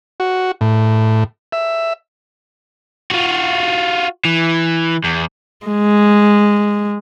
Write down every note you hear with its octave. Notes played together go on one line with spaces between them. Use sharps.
F#4
A2
E5
F4 F#4
E3
E2
G#3